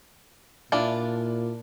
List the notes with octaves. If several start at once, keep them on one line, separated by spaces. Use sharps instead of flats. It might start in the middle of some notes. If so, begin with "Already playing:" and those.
A#2 D4 E4 F4